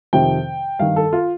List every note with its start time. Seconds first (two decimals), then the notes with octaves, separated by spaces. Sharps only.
0.13 F2 C3 D#3 G5
0.79 G2 D#3 F5
0.96 A4
1.13 F4